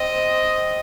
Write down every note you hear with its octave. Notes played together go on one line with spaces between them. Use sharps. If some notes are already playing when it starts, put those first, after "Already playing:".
Already playing: C4 D#5